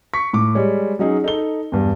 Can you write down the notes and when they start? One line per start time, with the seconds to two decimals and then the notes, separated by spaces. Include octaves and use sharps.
0.14 C#6 B6
0.33 A2 D6
0.55 G3 G#3 C#5
0.99 F#3 C#4 D#4 G#4
1.24 D#4 A4 G7
1.72 E2 G2